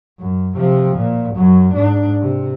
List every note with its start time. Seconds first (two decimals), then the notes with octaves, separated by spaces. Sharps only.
0.20 F#2
0.56 C3 F3
0.97 A#2
1.35 F#2 F#3
1.74 G#2 D4
2.21 C3